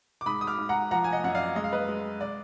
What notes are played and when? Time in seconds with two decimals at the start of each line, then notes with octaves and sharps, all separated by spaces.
0.21 D6
0.26 G#2 B5 D#6
0.41 D#6
0.47 D6 F6
0.58 G#2
0.69 F#5 A#5
0.91 F3 F#5 A#5
1.04 G#5
1.13 D#5 F#5
1.24 F#2 F#5
1.34 D5 F5
1.56 G#3 D#5
1.64 F5
1.72 B4 D#5
1.88 G#3
2.21 D5